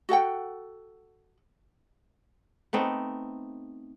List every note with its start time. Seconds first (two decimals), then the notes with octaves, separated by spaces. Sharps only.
0.09 F#4 A4 F#5 G5
2.73 A3 B3 C4 D#4